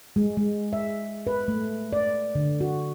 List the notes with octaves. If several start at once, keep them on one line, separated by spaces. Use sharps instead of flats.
G#3
G#3
E5
B4
A3
D5
D3
F#4